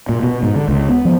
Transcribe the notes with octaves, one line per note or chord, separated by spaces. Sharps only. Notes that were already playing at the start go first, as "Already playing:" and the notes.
A#2
B2
G#2
D3
C#2
B3
F3